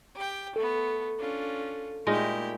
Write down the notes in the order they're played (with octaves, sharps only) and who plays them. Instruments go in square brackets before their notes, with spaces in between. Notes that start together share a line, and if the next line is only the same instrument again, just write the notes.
[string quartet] G4 G5
[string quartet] A3 B3 [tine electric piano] A4
[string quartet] C#4 D4 F4
[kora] A#2 G#3 D#4 [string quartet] A3 E4 G4